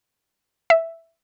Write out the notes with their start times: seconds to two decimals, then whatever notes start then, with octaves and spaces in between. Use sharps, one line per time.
0.70 E5